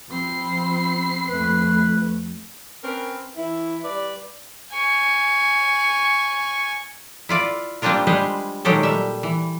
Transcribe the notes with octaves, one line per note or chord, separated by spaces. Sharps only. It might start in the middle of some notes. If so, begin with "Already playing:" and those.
F3 C4 B5 C7
F2 A3 B4
C4 C#4 A#4 B4
E3 E4
G3 B4 D5
G#5 C#6
E4 F4 D5
G3 A#3 C4 D4 F4 A#4
G3 G#3 B4 C5
A#2 D#3 F#3 G#3 G4 A4
G3 E5
E3